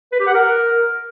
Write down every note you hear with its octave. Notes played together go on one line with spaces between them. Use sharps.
B4
G4
F#5
A#4